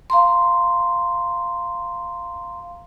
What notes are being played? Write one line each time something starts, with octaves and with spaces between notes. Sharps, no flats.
F5 A#5 C6